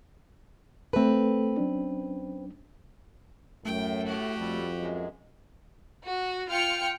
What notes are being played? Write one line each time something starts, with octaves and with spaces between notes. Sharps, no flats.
A3 C4 A4 B4
F#3 C#4 D4
F#2 A2 A3 G5
F#4 G4
F2 G3 A4
F#2 G#3
F#4
F4 G5 F6 C#7